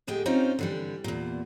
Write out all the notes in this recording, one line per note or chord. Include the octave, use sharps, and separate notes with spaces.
D2 A2 G#3 G4 G5
C4 C#4 D#4 F4
D3 E3 G3
E2 A#2